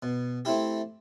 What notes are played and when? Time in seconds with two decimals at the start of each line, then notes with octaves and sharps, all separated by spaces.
0.03 B2
0.45 A3 C4 E4 G4